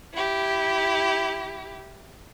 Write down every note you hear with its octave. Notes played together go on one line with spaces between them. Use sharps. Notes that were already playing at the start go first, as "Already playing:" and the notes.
E4 G4